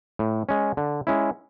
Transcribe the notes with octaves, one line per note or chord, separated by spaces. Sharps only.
A2
G#3 C#4
D3
G#3 C#4 E4